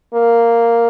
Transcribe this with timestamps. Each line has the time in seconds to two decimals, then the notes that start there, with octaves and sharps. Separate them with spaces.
0.14 A#3